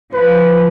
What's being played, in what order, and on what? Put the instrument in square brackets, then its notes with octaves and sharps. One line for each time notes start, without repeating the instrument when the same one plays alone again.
[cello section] F3 [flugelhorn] B4